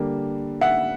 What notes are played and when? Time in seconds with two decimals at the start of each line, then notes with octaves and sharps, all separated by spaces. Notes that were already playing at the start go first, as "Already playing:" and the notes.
Already playing: D3 G3 A#3
0.61 E5 F#5